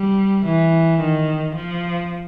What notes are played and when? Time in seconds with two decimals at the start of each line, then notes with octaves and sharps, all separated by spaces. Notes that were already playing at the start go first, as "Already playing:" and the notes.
Already playing: G3
0.46 E3
1.01 D#3
1.55 F3